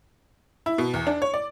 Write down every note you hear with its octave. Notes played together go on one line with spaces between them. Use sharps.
E4
B2
E2
D4
C#5
D5